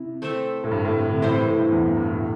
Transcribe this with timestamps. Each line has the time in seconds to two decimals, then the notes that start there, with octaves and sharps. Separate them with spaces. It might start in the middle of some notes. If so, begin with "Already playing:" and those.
Already playing: C3 E4
0.22 A3 C4 A4 E5
0.64 A2
0.71 G2
0.85 A2
0.97 C3
1.09 D3
1.16 C3
1.22 A2 E3 G3 E4 C5
1.47 A2
1.60 G2
1.72 E2
1.85 G2
1.97 G2
2.11 A2